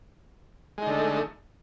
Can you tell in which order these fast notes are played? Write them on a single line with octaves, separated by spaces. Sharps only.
G#3 D#4 D3 A3